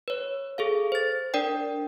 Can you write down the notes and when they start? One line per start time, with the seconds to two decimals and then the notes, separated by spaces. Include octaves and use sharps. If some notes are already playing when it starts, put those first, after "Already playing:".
0.08 B4 C#5
0.58 G#4 A4 F5
0.92 C5 A6
1.34 D4 A#4 D5 G5